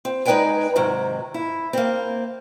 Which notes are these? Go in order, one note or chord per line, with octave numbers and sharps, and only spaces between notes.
C4
G#3 D#4 B4 D5 G5 G#5
G#2 C3 D#3 F#3
E4
A#3 C4